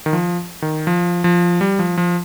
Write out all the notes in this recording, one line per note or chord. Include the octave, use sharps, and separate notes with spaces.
D#3
F3
D#3
F3
F3
G3
F3
F3